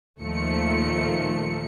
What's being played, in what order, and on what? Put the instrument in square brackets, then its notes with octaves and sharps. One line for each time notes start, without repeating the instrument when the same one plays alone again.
[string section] D#2 A#2 D#3 F3 A3 C#7